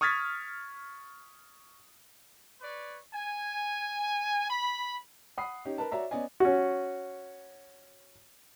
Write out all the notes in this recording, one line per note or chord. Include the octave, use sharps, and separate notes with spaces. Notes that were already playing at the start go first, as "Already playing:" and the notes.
C#6 D#6 F6 G#6 A6 B6
B4 C#5 D5
G#5
B5
F#5 B5 D#6 C7
C#4 D#4 G4
A#4 B4 A5
F#4 C#5 D5 E5 A#5
B3 C#4 D5 D#5 G#5
C#4 F#4